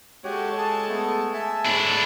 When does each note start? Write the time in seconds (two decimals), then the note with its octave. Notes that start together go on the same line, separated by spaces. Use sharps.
0.24 G#3 F#4 G4 A4 C#5
0.58 G#4 A5
0.89 A3 B3
1.33 E5 G#5 A5
1.66 G#2 A3 D4 E4 C#5